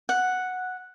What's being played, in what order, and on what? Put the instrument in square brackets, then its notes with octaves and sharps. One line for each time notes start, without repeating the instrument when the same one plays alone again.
[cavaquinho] F#5